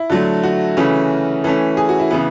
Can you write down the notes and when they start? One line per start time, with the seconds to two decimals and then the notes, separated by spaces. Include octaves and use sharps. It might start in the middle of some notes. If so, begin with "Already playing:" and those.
Already playing: E4
0.10 D3 F#3 A3
0.43 F#4
0.77 C#3 E3 A3 C#4
1.44 E3 A3 C#4
1.77 G#4
1.89 F#4
1.99 E4
2.11 C#3 E3 B3